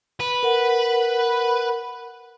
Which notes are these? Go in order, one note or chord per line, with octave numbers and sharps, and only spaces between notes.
B4
A#4 F#5